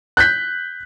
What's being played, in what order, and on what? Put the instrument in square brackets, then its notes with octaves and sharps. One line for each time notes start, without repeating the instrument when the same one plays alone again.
[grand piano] F#6 G6 B6